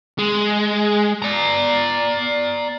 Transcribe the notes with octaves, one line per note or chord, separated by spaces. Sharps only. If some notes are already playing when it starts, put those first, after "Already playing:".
G#3
D5 A#5